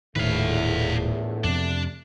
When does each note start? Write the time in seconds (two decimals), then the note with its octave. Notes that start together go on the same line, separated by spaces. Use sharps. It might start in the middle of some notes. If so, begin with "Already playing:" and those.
0.16 D#1 A#1 E2 A2 D#3 A3 B4 F5
1.44 F2 C3 D4